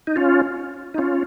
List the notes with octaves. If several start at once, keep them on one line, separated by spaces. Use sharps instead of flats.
D#4
C#4 F4
D#4
C#4 F4